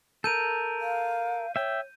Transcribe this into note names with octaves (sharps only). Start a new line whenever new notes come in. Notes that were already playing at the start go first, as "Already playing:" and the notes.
A4 A#4 G6 D#7
F5
C#5 E5 G5